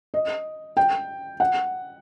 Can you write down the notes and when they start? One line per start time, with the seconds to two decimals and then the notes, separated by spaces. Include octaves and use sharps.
0.14 D#5
0.77 G5
1.40 F#5